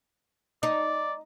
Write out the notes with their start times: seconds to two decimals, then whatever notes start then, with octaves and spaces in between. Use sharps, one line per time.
0.63 D#4 D5